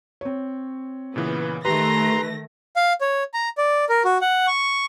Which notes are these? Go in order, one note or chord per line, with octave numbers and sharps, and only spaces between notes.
C4 C#5
A#2 C#3 E3 B3
D#3 A3 G4 B4 A#5 C6 A#6
F5
C#5
A#5
D5
A#4
F#4
F#5
C#6